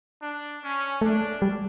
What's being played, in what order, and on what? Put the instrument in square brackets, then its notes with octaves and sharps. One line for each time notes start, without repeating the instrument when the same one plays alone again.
[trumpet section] D4
C#4
[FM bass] A3 [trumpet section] D4
[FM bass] G3